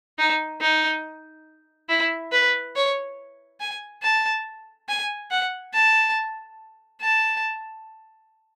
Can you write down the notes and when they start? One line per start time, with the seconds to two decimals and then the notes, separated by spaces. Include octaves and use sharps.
0.19 D#4
0.61 D#4
1.89 E4
2.32 B4
2.75 C#5
3.60 G#5
4.03 A5
4.88 G#5
5.31 F#5
5.74 A5
7.01 A5